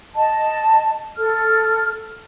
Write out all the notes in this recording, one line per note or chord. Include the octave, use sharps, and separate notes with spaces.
D#5 A5
A4 F6